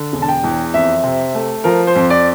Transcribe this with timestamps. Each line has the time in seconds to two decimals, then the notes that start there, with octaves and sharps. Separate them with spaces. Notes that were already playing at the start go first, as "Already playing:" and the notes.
Already playing: D3
0.13 E1
0.22 A5
0.28 G5
0.44 E2
0.74 F2 E5
1.04 C3
1.35 A3
1.64 F3 A#4
1.87 C5
1.95 F2
2.10 D5